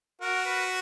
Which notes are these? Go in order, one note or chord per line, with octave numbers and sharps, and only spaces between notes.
F#4 A#4
B4